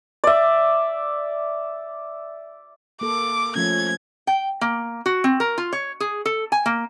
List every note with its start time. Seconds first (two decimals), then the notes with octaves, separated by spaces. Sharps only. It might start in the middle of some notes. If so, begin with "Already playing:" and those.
0.24 D5 E5
3.01 A#3 A4 D6
3.56 F3 A3 C#4 G#6
4.27 G5
4.61 A#3
5.06 F#4
5.24 C4
5.40 A#4
5.58 F4
5.73 C#5
6.00 G#4
6.26 A4
6.52 G#5
6.66 A#3